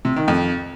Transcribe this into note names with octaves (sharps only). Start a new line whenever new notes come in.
C3
D#3
F2